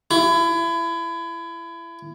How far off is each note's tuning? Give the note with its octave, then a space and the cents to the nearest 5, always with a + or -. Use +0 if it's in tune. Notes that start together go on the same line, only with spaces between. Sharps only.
E4 +30